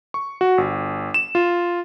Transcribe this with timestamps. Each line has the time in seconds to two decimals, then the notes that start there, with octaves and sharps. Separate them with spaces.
0.14 C#6
0.41 F#4
0.58 G1
1.14 E7
1.35 F4